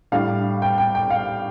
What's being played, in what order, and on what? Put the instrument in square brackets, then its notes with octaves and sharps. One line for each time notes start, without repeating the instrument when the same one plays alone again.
[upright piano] A2 G3 D4 F5
G5
G5
G5
F5